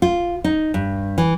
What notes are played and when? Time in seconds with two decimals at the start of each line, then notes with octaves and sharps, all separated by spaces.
0.02 F4
0.44 D#4
0.74 G2
1.18 E3